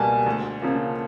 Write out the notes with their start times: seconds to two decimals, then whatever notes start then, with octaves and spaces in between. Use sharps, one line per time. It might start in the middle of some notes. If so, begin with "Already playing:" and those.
Already playing: C#2 B2 G3 A#3 G#5 A5
0.26 D2
0.62 C#3 F3 A#3